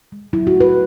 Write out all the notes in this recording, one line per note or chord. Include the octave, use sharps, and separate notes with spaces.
G#3
F#3 E4
F#4
A3
B4